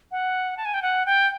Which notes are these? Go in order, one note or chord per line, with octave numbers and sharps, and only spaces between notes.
F#5
A5
G#5
G5
F#5
G5